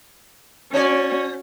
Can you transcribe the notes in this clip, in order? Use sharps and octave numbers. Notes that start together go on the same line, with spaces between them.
C4 C#4 F#4 D5